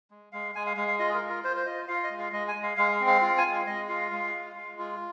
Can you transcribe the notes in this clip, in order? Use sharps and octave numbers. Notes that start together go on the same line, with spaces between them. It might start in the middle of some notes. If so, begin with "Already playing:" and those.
G#3
G#3 F5
G#3 G#5
F5
G#3 F5
F5
F4 D#5
G#4
A#4
F4
A#4
F4 C5
C5
F4 D#5
F4 F5
D#5
G#3
F5
G#3 D#5
G#5
G#3
F5
G#3 F5
F5
C4
F5
F4 F5
G#5
G#3
F5
G#3 D#5
F4 F5
G#3 F5
F4
G#3
F4